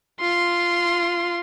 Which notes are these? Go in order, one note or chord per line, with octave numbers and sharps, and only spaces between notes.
F4 C6